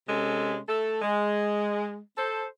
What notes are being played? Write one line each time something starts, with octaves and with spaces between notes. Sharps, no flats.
C3 G#3 C#4 A4
A3 A4
G#3
A4 C5